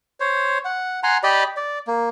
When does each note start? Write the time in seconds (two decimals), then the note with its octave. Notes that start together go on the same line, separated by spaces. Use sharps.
0.20 C5 C#5
0.65 F#5
1.03 F#5 G#5 A#5 C6
1.23 G4 D5 D#5 B5
1.57 D5
1.87 A#3